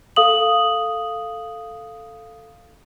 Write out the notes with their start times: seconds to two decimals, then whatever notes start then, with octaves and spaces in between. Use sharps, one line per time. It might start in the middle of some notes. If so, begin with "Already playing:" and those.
0.16 A4 F5 D#6 F#7